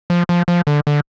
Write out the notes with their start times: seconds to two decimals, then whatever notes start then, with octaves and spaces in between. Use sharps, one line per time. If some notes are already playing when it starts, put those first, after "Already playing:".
0.10 F3
0.29 F3
0.48 F3
0.67 D3
0.87 D3